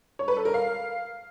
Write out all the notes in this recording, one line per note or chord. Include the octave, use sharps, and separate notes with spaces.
C#5
B4
A4
A#4
F5